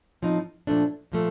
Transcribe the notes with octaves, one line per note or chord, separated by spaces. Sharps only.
A2 F3 C4 D#4
A#2 F3 A3 D4
A#2 F3 A3